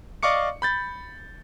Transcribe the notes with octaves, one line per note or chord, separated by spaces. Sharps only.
D5 D#5 F5 C#6 D6 C#7
B5 G6 A6